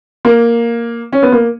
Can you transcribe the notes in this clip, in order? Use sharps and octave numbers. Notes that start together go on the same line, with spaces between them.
A#3
C#4
B3
A#3